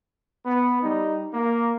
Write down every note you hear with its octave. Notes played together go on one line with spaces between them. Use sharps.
B3
G3 D#4
A#3